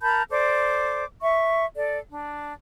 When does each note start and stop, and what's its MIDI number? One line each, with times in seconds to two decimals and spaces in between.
0.01 0.22 70
0.01 0.22 81
0.01 0.22 83
0.01 0.22 91
0.29 1.04 69
0.29 1.04 72
0.29 1.04 74
0.29 1.04 86
1.21 1.64 76
1.21 1.64 85
1.76 1.97 69
1.76 1.97 74
2.10 2.53 62